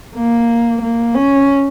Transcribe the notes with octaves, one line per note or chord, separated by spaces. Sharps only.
A#3
A#3
C#4